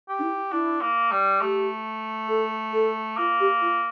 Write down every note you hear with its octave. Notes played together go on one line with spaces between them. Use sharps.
G4
D4
E4
D4 E4
A#3
G3
A3 G4
A4
A4
A#3 F4
G4
F4